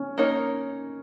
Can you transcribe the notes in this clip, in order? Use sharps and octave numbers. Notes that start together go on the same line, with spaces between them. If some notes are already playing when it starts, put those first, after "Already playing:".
Already playing: C#4
A#3 D#4 A#4 C#5